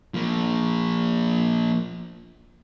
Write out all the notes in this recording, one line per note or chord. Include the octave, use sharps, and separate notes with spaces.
F3 A#3